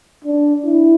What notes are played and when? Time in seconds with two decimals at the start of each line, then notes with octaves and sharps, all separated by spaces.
0.25 D4
0.66 E4